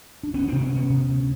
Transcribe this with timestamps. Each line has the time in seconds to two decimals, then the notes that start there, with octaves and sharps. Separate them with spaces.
0.23 D4
0.34 D2 B3 C#4
0.48 C3 C4 D4
0.61 B3 C#4
0.72 D2
0.75 B3 C#4
0.90 C3
1.09 D2